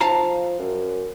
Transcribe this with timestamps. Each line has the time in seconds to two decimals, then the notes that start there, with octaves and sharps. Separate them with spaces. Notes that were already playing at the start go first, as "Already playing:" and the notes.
0.01 F3 F5 A5 A#5
0.59 F#2